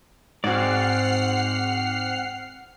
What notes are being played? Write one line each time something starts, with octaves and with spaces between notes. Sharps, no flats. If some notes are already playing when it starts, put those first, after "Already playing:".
G#2 C4 F#4 D5 F#5 F6 C7